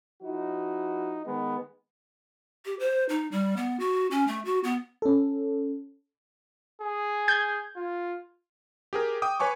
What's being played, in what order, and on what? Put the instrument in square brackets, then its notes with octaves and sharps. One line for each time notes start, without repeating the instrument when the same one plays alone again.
[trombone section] F3 D#4 E4 F#4
D#3 G#3 B3
[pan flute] G4
C5
D#4
G3
B3
F#4
C#4
A3
F#4
B3
[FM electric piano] C#4 A4
[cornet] G#4
[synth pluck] G6 G#6
[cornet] F4
[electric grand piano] G4 G#4 A#4
G5 D6 D#6
B4 C#5 G#5 C#6 D6